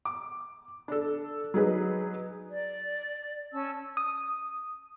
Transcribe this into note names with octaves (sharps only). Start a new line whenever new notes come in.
D6
D4 A4
F#3 D#4 G#4 B4
D5
C#4 A5 E6
D#6